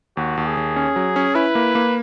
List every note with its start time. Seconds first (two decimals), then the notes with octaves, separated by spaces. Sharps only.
0.17 D#2 F#4
0.37 D#2
0.46 G#4
0.57 D#2
0.76 C#4
0.96 F#3
1.16 C#4
1.35 E4 B4
1.55 A#3
1.75 A#3